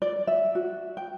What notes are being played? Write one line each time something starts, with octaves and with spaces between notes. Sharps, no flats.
D5
E5
F#4
G5